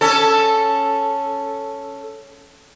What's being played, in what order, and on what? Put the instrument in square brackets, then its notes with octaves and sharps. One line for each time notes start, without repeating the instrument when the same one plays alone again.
[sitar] C#4 A4